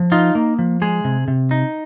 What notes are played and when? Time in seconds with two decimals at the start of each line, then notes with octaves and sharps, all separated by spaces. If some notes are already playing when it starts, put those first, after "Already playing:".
Already playing: F3
0.12 D#4 F4
0.35 A#3
0.59 F3
0.82 G#3 G#4
1.04 C3
1.28 C3
1.51 D#4